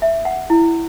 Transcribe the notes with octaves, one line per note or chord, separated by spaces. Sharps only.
E5
F#5
E4